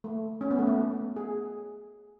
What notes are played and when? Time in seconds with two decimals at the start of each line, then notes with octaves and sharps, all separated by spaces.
0.04 A3
0.41 C#4
0.51 B3
0.59 A3
0.67 B3
1.16 G#4